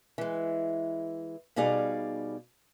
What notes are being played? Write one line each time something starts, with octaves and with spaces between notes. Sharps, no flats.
E3 G#3
B2 G3 D#4 G#4 D5 F5